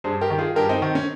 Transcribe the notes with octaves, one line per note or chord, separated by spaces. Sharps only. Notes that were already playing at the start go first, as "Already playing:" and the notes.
G2 G#4 C5
G4 A#4
D#3
F4 G#4
G2 G4 A#4
C4 D#4
D#3 C4
C#4